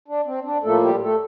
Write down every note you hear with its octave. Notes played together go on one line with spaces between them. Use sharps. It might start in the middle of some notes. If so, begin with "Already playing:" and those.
D4
C4
D4
A2 F3 A3 A#3 A4
G3 G4
A3 A4